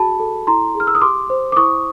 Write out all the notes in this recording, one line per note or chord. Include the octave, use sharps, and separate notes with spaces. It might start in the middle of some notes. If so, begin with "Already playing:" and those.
Already playing: F#4 G#4 A5 B5
A4
E4 A#5 C6
G#4 F6
E6
D#6
G4 C6 D6
C5
D6
E4 C#6 D#6